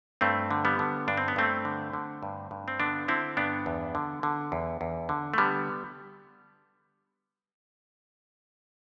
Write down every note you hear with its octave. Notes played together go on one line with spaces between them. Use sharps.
G2 A3 C4
D3
G3 B3
D3
G2 D4
C4
B3
G2 A3 C4
D3
D3
G2
G2
C4
D3 B3 D4
D3 C4 E4
G2 B3 D4
E2
D3
D3
E2
E2
D3
A3
D3 G3 B3